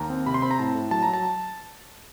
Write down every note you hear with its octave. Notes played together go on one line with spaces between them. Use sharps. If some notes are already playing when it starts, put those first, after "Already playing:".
Already playing: D#2 A#5
C4
C3 B5
C6
C4 B5
A#5
A2 A5
A2
F#3 A5
F#3 A#5
A5